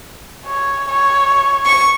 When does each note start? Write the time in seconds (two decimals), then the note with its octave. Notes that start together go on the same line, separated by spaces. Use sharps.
0.46 C#5
0.88 C#5
1.65 C#6